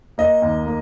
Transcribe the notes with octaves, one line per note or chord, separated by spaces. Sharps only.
A#3 D#5
D#2
A#3